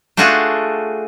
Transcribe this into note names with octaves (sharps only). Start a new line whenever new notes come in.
A3 D4 F4 F#4 G#4 A4